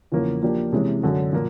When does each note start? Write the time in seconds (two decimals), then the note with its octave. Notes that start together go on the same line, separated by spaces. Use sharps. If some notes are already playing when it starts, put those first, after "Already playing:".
0.12 E2 C#3 F3 A#3
0.42 F3 A#3 D4 G4
0.73 C3 E3 G#3 C#4
1.02 F#2 D3 F#3
1.33 A#2 F3 A#3